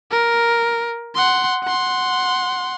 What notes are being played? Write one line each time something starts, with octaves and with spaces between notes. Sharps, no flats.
A#4
F#5 C6
F#5 C6